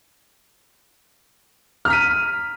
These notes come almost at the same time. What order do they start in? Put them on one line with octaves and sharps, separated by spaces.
F6 A#5 B6 D#7